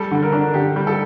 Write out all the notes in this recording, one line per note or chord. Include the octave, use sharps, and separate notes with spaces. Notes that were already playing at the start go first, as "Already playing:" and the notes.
Already playing: G3 A4
D3
A#4
D4
D3 G4
G3
A4